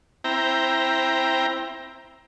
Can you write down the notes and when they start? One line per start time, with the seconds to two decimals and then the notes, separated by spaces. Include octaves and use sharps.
0.24 C4 E4 G5 A#5